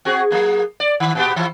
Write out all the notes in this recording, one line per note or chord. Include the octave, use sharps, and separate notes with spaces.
C4 F#4 G#4
F#3 A#3 G#4
D5
D#3
A#2 B3 G4
E3 F3 E4